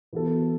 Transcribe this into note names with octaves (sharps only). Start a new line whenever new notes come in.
E3 B3 F#4 A4